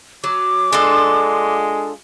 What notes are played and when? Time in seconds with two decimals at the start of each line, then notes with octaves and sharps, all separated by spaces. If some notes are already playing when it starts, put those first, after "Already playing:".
0.24 F#3 D6
0.73 G#3 D4 F4 A4